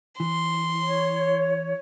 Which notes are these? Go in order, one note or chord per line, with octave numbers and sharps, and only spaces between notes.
E3 C6
C#5